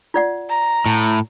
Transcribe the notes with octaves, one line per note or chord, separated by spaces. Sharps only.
F4 D5 F#5
A#5
A2